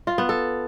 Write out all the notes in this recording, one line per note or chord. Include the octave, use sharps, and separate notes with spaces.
F4
B3
A4